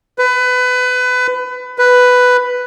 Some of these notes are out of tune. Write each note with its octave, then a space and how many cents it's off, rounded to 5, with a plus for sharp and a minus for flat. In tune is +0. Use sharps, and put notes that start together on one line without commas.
B4 +25
B4 +5